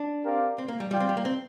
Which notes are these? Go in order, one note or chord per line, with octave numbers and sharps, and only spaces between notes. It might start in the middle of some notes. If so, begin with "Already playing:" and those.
Already playing: D4
C4 G4 A#4 D5 F5
C4
A#3
G3
G3 F4 D5 G5
C4
G3
A#3
C4